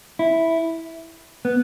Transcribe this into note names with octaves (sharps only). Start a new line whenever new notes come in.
E4
B3